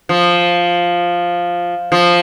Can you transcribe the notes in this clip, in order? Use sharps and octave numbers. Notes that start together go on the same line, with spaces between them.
F3
F3